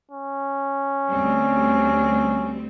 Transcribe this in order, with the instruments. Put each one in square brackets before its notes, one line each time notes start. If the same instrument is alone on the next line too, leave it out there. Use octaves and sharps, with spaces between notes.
[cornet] C#4
[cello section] D2 G3 C4